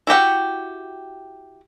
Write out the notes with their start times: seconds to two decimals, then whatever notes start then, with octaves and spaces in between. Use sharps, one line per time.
0.07 E4 F#4 G4 F#5